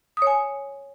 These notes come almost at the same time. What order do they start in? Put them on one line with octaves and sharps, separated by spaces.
D#6 C#5 G#5